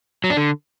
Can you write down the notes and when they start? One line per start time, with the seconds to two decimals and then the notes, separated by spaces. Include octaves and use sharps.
0.24 F#3
0.30 D4
0.37 D3